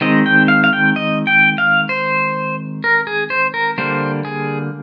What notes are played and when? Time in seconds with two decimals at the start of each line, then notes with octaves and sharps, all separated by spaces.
0.01 D#3 G#3 C4 D#5
0.26 G5
0.48 F5
0.64 F5
0.73 G5
0.96 D#5
1.27 G5
1.58 F5
1.89 C5
2.84 A#4
3.07 G#4
3.30 C5
3.54 A#4
3.78 D3 G3 A#3 C5
4.25 G#4